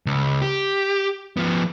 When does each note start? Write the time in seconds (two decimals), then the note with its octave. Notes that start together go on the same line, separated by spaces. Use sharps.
0.06 C#2
0.42 G4
1.37 F3 B3